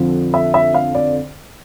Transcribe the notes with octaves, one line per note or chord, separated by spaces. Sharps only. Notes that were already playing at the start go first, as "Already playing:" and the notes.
Already playing: F2 D3 F3
E5
E5
F5
D5